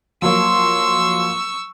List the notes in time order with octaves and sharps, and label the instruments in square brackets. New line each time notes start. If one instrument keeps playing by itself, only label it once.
[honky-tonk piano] F3 F#3 A#3 [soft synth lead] C6 [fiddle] C#6 E6